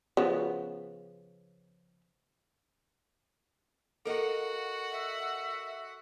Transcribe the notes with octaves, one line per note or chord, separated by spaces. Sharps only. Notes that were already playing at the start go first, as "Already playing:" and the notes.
C#3 F3 B3
F#4 A4 A#4 D#5 F5 F#5
E5